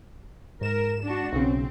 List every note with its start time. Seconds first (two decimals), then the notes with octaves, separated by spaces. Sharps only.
0.61 G#2 A#4 E7
1.02 D4 F#4
1.33 B1 C#3 C4